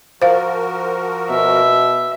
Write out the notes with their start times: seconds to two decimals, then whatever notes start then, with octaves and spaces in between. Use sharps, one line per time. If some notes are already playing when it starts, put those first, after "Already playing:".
0.22 F3 F#4 A#4 C5 F5
1.30 B2 E5